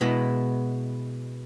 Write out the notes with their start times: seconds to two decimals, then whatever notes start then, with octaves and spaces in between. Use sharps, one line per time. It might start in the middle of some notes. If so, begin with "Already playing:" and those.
0.01 B2 G#3 B3 E4